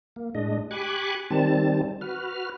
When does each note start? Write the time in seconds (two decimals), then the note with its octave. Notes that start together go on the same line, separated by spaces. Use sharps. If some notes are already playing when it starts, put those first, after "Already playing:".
0.16 A#3
0.35 A2 G#3 D4 D#5
0.71 G4 G#5 B5 C#6 D6 F#6
1.31 D#3 G3 C4 A5
2.01 F#4 B4 F6